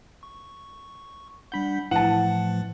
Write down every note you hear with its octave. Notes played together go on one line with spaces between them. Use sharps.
C#6
G3 D4 F#5 B5 G6
A2 E3 F3 A3 F#5 A5